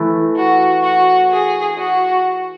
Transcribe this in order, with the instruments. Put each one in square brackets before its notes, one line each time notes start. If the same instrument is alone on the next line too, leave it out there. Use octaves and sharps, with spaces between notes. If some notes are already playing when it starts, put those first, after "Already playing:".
Already playing: [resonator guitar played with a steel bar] E3 A3
[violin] F#4
F#4
G#4
F#4